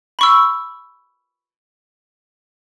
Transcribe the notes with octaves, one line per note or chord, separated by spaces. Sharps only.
B5 C#6 E6